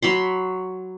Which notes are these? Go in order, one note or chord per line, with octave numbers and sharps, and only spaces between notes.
F#3 B5 C6